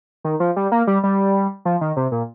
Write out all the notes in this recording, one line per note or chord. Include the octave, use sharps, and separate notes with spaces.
D#3
F3
G3
A#3
G3
G3
F3
D#3
C3
A#2